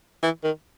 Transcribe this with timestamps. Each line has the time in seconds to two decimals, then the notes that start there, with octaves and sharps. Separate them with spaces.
0.23 E3
0.44 D#3